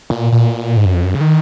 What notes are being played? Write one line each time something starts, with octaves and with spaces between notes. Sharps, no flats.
A#2
A#2
G#2
F#2
F2
F#2
C#3
D#3